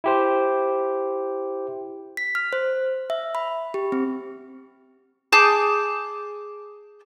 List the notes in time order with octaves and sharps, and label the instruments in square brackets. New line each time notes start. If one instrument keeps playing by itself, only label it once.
[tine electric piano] E4 G4 C5
[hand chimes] B6
F6
C5
E5
B5
G4
C4
[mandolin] G#4 A5 D6 G6